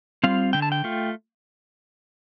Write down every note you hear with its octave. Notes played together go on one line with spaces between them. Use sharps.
G3 C4 F4 F5
D3 G5
A5
G5
A3 F4